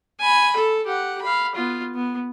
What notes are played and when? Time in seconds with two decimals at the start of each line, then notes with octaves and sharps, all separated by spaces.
0.20 G#5 B5
0.56 A4
0.86 G4 F#5
1.22 F5 B5
1.55 B3 F4
1.95 B3